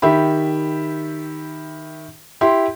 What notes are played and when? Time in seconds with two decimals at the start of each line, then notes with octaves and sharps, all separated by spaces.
0.02 D#3 G4 E5 B5
2.41 E4 G4 C6